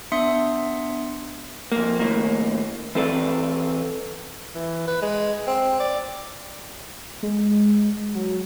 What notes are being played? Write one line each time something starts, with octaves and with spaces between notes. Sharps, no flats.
B3 D4 E5 C6 D#6 C#7
F2 A#3
D#2 A2 A#3
E3 C4 A4 B4 D5
E3
B4
G#3
C4
D5
G#3
F#3